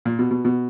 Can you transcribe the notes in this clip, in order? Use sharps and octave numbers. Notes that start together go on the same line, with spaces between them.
A#2
B2
B2
B2